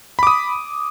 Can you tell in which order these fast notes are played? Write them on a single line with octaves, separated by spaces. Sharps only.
B5 D6 D#6